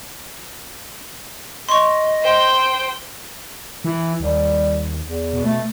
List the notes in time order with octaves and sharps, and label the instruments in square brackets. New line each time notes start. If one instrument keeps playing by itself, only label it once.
[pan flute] D#5 [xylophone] C6 C#6
[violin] C5 G5
[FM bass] E3
[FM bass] D#2 [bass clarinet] G3
[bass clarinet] E2
[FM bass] B2
[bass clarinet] A3